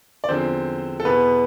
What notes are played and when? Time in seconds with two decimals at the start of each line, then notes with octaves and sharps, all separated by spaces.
0.24 D5
0.29 E2 D3 F3 C4 C5
1.00 A4
1.05 E2 B2 B3 B4